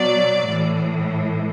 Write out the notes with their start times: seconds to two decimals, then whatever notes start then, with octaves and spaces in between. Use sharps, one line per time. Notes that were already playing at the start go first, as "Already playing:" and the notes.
Already playing: B2 F#3 D5
0.49 A2 E3